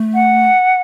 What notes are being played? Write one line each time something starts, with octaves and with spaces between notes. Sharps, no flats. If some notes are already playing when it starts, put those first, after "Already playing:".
Already playing: A3
F#5